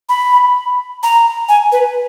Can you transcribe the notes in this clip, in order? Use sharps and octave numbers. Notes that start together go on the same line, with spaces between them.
B5
A#5
G#5
B4